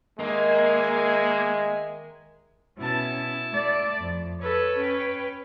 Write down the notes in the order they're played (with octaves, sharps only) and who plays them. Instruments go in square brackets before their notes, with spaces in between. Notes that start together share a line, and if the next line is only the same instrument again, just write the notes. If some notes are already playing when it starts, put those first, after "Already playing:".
[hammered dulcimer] D#3 [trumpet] G#3 [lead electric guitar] A#3 [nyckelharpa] E5 G#5
[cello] B2 C#4 [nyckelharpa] E4 A5
[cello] A3 D5
F2
[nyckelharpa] A4 [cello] B4 C#5
[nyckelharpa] C#4 G5